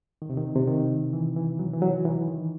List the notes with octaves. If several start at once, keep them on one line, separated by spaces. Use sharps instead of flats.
D#3
C3
D#3
C3
D#3
E3
E3
F#3
E3
F#3
E3
D#3